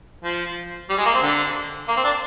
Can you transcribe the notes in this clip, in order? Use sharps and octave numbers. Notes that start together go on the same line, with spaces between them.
F3
G3
G#3
A#3
C4
D3
A#3
C4
D4